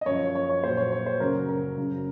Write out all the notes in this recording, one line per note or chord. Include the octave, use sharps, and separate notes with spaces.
D#5
F#2 F3 C#5
C#5
C#5
A#2 F#3 C5
C#5
C#5
C5
F#2 C#3 F#3 A#4
A#4
F#2 C#3 F#3